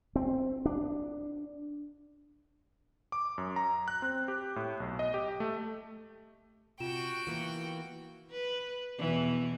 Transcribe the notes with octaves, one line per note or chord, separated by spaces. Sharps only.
C4
D4
D6
F#2
A#5
F#6
C4
G4
A2
B1
D#5
G4
A3
C3 F4 F#4 G5 E7
E3 A#3 B3
B4
E2 B2 E3